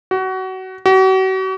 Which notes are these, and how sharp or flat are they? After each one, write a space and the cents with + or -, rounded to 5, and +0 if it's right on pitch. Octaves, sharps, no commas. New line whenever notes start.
F#4 +25
F#4 +40